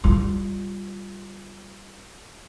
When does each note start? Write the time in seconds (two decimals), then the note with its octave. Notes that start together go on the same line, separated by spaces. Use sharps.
0.04 G3 F4